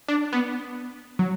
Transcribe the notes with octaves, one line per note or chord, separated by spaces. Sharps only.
D4
B3
F#3